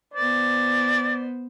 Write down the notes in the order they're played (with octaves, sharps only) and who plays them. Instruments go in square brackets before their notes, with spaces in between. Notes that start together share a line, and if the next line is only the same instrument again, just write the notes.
[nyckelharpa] B3 C5 [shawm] D5